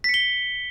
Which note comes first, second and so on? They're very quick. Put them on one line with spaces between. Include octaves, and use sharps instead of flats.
B6 C#7 G7